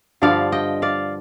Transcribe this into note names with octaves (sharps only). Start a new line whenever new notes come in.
G2 D3 F3 D5 F5
D#5 G5
D5 F5